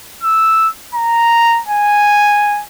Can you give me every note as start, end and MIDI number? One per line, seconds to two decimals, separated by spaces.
0.23 0.68 88
0.95 1.60 82
1.69 2.63 80